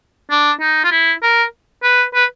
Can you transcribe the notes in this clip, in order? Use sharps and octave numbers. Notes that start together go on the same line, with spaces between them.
D4
D#4
F4
E4
A#4
B4
B4